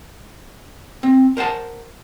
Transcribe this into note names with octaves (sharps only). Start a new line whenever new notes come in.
C4
A#4 C5 F#5 A5